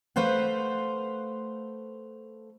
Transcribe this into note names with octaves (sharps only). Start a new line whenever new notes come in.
A3 B4 C5 F5 F#5